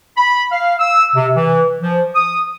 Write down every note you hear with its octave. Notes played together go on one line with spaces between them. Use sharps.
B5
F5
E6
C3
E3
F3
D#6